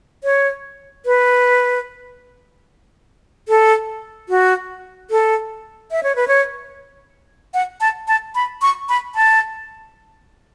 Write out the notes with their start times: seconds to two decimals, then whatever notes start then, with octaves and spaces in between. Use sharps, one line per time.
0.24 C#5
1.06 B4
3.48 A4
4.29 F#4
5.11 A4
5.91 E5
6.03 C#5
6.16 B4
6.28 C#5
7.54 F#5
7.81 A5
8.08 A5
8.35 B5
8.62 C#6
8.89 B5
9.15 A5